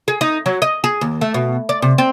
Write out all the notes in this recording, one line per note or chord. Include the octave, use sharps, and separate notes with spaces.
G#4
D#4
F#3
D#5
G#4
D#2
A3
B2
D5
C3
C4